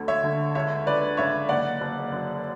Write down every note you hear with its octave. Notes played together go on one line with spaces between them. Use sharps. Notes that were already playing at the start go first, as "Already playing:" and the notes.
Already playing: D2 D3
C#5 E5
D3
C#2 C#5 E5
C#2 B4 D5
C#3 C#5 E5
F#1 D5 F#5
F#1
F#2